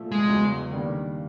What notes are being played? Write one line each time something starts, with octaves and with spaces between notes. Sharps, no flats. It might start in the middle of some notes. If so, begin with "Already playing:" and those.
Already playing: A#2 F3 A3
G#3
E2 C#3 F#3
D#3 G3 A#3 D4